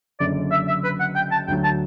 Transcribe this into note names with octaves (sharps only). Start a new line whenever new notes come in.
F#1 F#2 D3 D5
E5
E5
B4
F#5
G5
A5
D2 D3 F#3 G5
A5